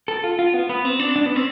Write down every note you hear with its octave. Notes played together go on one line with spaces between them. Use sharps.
A4
F4
F4
B3
B3
C4
D4
D4
B3
C4